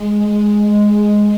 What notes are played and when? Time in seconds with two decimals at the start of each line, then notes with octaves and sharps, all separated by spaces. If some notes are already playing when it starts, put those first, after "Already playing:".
Already playing: G#3
0.12 G#3
0.49 G#3
0.86 G#3